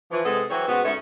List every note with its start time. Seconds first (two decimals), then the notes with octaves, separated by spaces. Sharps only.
0.11 E3 F3
0.24 C3 G#3 B3 G#4 A4
0.50 E3 F#3 C4 F#4 G#4 C#5
0.68 G#2 B2 B3 C#4 F#4
0.83 D2 G#2 A3 C#4 C#5